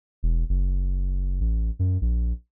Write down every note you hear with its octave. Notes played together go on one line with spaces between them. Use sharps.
E1
F#1
A1
F#2
A#1